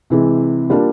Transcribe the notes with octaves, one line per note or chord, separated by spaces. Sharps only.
C3 E3 G#3
G3 A#3 D4 F4